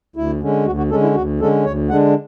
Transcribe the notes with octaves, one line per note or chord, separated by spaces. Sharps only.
D2 E4
D3 G#3 C#4
D2 F#4
F#4
D3 G#3 C#4 A4
E4
D2 F#4
D3 G#3 C#4 A4
D2 C#5
D3 G#3 D4 F#5